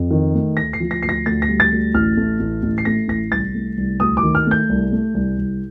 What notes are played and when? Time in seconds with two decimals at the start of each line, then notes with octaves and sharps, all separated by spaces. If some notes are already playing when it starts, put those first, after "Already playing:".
Already playing: F2
0.11 D#3
0.34 A3
0.56 D2 A#6
0.73 C7
0.80 F3
0.91 A#6
1.03 D2 C7
1.09 A#6
1.26 D2 A6
1.42 A#6
1.48 G3
1.60 A6
1.71 D2
1.94 A1 F6
2.17 A3
2.40 A1
2.63 A1
2.78 C7
2.85 A3 A#6
3.08 A1 A#6
3.32 C2 A6
3.54 A3
3.77 C2
4.00 D2 D#6
4.17 D6
4.23 D#3
4.35 F6
4.47 A3 G6
4.69 C2
4.92 A3
5.14 C2
5.38 C2